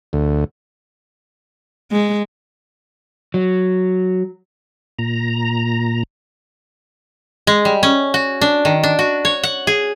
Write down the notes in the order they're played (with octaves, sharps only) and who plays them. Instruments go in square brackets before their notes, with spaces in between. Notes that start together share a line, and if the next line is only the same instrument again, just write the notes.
[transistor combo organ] D2
[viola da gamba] G#3
[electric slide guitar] F#3
[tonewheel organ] A#2 A#5
[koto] G#3
G3
C#4
F#4
D4
D#3
D4
F#4
C#5
F#5
G#4